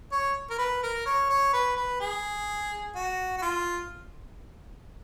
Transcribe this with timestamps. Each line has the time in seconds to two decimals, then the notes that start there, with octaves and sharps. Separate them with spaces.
0.12 C#5
0.50 A#4
0.59 B4
0.83 A#4
1.06 C#5
1.30 C#5
1.53 B4
1.77 B4
2.01 G#4
2.95 F#4
3.38 F#4
3.42 F4